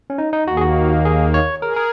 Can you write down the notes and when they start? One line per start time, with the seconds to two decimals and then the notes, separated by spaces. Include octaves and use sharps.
0.10 C#4
0.18 D#4
0.33 D#4
0.47 D#2 D#3 A#3 F#4
0.57 G#4
0.61 F#4
1.05 G#4
1.34 C#5
1.62 G#4 A#4
1.76 A#4